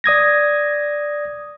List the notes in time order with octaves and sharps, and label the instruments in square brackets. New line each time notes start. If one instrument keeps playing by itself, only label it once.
[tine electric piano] D5 D#6 G#6 A#6